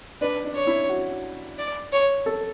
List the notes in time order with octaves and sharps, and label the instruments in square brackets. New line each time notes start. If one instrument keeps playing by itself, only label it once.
[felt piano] D4 [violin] B4
[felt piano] D4
[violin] C#5
[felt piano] E4
F#4
[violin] D5
C#5
[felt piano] A4